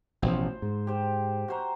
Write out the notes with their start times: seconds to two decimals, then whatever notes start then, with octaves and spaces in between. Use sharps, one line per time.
0.22 A1 B2 F3 C5
0.62 G#2
0.87 G4 C5
1.48 F#4 C5 A#5